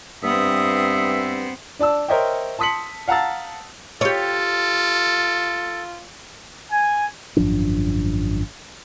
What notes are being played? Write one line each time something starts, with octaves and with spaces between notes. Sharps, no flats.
G2 B3 C4 E5 D#6
D4 D5 A5 E6
A#4 C5 C#5 D#5 E5 G5
A5 C6 D#6 B6 C#7 F#7
F5 F#5 A5 A#5 E6 A6
F4 G4 A4 C#5
G#5
G#1 F#2 F3 D4